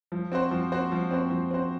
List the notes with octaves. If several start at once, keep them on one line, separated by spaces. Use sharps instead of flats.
F3
C4 F#4 C5
F3
C4 F#4 C5
F3
C4 F#4 C5
F3
C4 F#4 C5